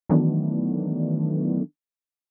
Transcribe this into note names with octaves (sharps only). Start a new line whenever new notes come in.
D#3 E3 F#3 A3 B3 D4